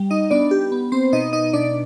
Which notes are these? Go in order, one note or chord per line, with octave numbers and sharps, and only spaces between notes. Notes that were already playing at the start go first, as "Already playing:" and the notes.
Already playing: G3
D#4 D#5
B3 D4 D5
G4
B3
C4 C5
B2 D#4 D#5
D#4 D#5
B2 D4 D5